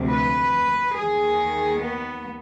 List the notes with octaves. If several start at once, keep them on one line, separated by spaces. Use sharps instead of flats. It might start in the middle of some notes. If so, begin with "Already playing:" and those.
Already playing: D2 C3 F3
B4
D#2 D#3 G#4
B3